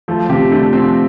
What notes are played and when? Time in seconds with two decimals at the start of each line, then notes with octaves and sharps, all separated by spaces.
0.08 F3 A3
0.29 C3 G4
0.51 D3 A3
0.73 F3 C4